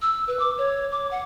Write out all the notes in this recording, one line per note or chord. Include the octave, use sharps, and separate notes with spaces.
E6
B4
D6
C#5
D6
F#5